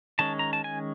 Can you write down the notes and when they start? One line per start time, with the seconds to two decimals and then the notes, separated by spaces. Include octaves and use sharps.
0.19 D#3 G#3 C#4 A5
0.39 A#5
0.53 A5
0.64 G#5